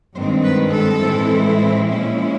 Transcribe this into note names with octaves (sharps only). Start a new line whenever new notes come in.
G2 D#3 G#3 C4 C5
B4
A4
A2 E3 G#3 C4 E4
A#2 F3 G#3 C#4 E4